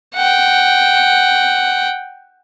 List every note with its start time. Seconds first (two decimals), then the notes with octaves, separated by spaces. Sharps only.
0.15 F#5 G5